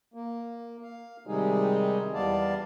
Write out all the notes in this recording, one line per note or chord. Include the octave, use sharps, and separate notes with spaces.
A#3
F5
C3 D#3 G3 G#3 D#4 G#4
E2 G3 B3 D5 F5 A5